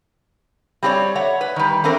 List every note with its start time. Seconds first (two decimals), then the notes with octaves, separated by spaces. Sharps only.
0.83 G3 C4 F#4 G4 C#5 D5
1.15 A3 C#5 F#5
1.41 B4
1.56 D#3 G3
1.84 E2 A3 C4 D4 A#4